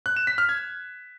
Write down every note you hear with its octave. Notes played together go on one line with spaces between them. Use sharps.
F#6
E7
B6
F6
G#6